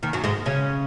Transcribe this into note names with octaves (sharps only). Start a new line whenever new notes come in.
D#2 D#3
F#2 F#3
G#2 G#3
C#3 C#4